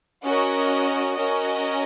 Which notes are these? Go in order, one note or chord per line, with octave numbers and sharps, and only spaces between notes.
C#4 F#4 A#4 D#5
C#4 F#4 A#4 D#5